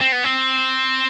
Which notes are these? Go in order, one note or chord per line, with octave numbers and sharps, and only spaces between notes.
C4
B3
C4